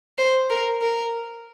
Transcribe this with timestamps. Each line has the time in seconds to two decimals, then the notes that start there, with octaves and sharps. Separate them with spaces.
0.18 C5
0.50 A#4
0.82 A#4